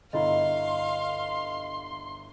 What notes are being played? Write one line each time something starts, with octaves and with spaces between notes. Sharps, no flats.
G1 E4 D#5 F5 A#5 C6